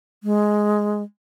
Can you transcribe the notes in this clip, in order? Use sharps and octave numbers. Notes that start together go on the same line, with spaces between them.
G#3